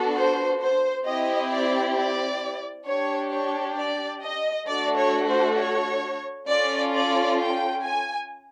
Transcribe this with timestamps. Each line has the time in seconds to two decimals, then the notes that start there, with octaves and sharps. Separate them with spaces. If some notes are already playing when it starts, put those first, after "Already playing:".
Already playing: B3 D4 F#4 A4
0.15 C5
0.60 C5
1.05 C4 E4 G4 D#5
1.50 D5
1.96 D5
2.86 D4 G4 C#5
3.31 C#5
3.76 D5
4.22 D#5
4.67 A3 D4 F#4 A4 D5
4.97 C#5
5.27 C5
5.57 C#5
6.48 C#4 F4 A4 D5
6.93 D5
7.39 G5
7.83 G#5